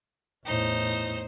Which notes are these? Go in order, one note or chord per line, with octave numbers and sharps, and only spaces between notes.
E2 A2 D#4 C5